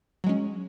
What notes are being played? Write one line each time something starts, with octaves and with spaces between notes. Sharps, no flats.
F#3 G#3 C#4